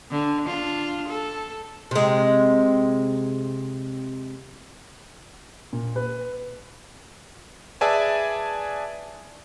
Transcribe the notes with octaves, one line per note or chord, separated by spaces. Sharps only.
D3
D4 F4
A4
C3 G#3
A#2
B4
G#4 B4 D5 E5 G#5 A5